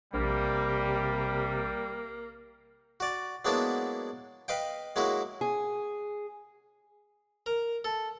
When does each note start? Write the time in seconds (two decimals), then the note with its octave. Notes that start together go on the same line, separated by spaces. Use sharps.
0.14 A#1 C3 G3 A#3
3.00 F#4 D5
3.45 F#3 G#3 A#3 B3 D4 E4
4.48 B4 D#5 F5 G5
4.96 F#3 G#3 A#3 E4 F#4
5.41 G#4
7.46 A#4
7.85 A4